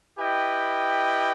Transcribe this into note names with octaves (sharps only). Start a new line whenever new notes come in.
E4 G4 B4 D#5 G5